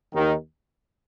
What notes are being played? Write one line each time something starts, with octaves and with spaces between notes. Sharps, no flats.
D#2 D#3